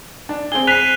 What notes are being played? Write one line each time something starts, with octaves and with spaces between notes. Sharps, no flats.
D4
C4 G#4 G7
F#6 B6 C7 D#7 F7
D#7